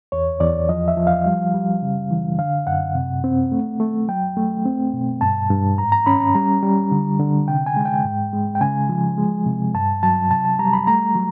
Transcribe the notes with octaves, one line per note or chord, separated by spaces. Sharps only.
E2 C#5
E2 D5
F3 D#5
E5
F3
F5
G3
G3
C#3
E3
D3 F5
F#2 F#5
C3
C4
A3
A3
F#3 G5
A3
C4
B2
G2 A5
G2
G#2 A#5
A#5
C#4 B5
A#5
G3 A#5
G3
D3
D3
C3 G5
G#5
G#3
G5
G#2
G#3
G5
C#3 G#5
F3
G#3
C3
G2 A5
F#3 A5
C3 A5
A5
G3 A#5
B5
A3 A#5
F#3